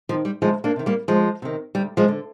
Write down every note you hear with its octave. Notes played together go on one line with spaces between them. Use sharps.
D#3 F3
G3
D2 F3 G#3
A#3 D4
C3 D#3
G3 A#3
D2 F3 G#3
C3 D#3
D2 G3
F3 G#3
D3